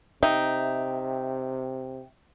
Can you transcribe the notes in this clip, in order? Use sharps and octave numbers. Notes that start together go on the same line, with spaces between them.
C3 D#4 E5 G5